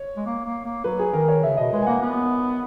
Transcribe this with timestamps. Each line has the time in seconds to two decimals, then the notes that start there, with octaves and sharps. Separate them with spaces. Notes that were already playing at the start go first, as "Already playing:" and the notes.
Already playing: C#5
0.17 G#3
0.26 A#3
0.46 A#3
0.65 A#3
0.84 F#3 B4
0.99 G#4
1.13 D#3 A#4
1.28 C#5
1.43 C#3 E5
1.57 B2 D#5
1.73 G#3 B4
1.82 G#5
1.87 A#3 F#5
2.02 B3